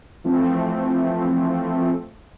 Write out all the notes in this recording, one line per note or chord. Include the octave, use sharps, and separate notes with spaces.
E3 F3 A3 C4